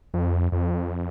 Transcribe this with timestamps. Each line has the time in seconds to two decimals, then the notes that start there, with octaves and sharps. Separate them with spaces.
0.14 F2
0.52 F2